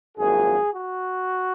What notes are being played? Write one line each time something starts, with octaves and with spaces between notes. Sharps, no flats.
G#1 F#2 F3 A#3 G#4
F#4